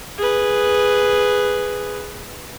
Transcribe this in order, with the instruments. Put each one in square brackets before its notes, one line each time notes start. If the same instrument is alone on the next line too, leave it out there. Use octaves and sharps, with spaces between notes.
[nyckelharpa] G#4 B4